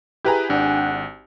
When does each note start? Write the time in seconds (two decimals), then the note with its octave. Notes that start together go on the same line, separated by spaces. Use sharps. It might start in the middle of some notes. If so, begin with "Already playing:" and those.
0.24 E4 G4 G#4 B4 A#5
0.50 G#1 D4 F#5